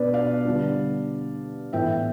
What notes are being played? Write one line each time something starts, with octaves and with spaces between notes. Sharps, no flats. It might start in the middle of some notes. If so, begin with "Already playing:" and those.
Already playing: B2 B3 D4 B4 D5
D5 F5
D3 G3 B3 D4
A2 E3 B3 E5 G5